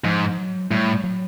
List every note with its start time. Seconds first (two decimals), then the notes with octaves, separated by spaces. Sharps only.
0.04 G#2 F3
0.38 F#3
0.71 A2 G3
1.04 F#3